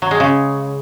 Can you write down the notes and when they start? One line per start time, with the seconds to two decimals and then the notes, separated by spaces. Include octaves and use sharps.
0.02 F#3
0.11 G#3
0.20 C#3